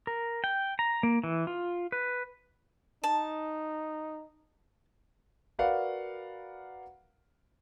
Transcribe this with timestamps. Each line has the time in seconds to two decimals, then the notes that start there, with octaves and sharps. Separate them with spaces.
0.07 A#4
0.44 G5
0.79 A#5
1.03 A#3
1.24 E3
1.47 F4
1.92 B4
3.04 D#4 A5
5.59 F#4 A#4 B4 D5 F5 F#5